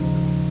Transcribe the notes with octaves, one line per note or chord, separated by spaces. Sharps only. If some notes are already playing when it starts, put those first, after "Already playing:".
Already playing: D#2 C#3 F3 D#4